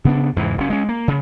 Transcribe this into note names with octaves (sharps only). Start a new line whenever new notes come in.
C#3 B3 D4
E2 G#2 C#3 E3
F#1 C#4
G#3 C#4
A#3
C#3